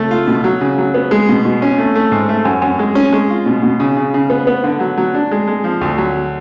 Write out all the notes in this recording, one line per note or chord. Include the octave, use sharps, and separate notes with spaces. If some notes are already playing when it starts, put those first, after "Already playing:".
Already playing: C#2 A3 A4
F4
B2
F#3
C#3
F#3
B3
G#3
B2
B2
C#4
A3
A3
G#2
A3
F#2
F#2
G#3
C#4
G#3
F4
B2
B2
C#3
C#3
C#3
B3
B3
D3
F#3
F#3
D4
G#3
G#3
F3
D2
F#3